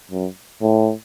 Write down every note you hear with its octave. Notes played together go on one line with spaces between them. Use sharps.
F#2
A2